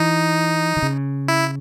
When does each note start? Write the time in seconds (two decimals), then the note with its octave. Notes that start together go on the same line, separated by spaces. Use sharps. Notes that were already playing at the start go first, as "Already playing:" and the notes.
Already playing: E3 D#4
0.77 D#3
0.82 C#3
1.28 E4